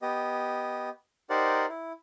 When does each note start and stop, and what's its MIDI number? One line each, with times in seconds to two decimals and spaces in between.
0.02 0.89 59
0.02 0.89 67
0.02 0.89 75
1.30 1.66 63
1.30 1.66 67
1.30 1.66 70
1.30 1.66 72
1.30 1.66 74
1.30 1.66 78
1.69 1.92 64